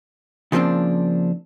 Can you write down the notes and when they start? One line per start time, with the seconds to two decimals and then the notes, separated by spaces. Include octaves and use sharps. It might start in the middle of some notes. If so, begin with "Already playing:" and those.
0.52 C#3 F3 G3 A#3 C4 D4